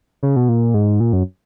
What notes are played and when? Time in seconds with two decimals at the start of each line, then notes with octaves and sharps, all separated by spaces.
0.23 C#3
0.36 B2
0.49 A#2
0.74 G#2
1.00 A#2
1.13 F#2